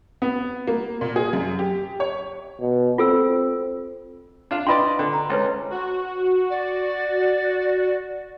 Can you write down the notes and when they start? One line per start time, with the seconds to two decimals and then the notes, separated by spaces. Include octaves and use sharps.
0.22 B3
0.67 A#3
1.01 A#2
1.16 G#4
1.33 F#2
1.59 G4
2.00 C#5
2.61 B2
2.98 C4 F4 A4 E6
4.51 D4 F4 F5
4.67 D4 F4 B4 D5 D#5 G5 B5 C6
4.99 D3 G5
5.13 A#5
5.30 C#2 B4 C#5 G5
5.70 F#4
6.50 D5